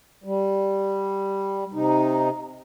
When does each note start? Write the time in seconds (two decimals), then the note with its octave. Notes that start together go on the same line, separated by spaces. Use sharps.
0.24 G3
1.74 C3 D#4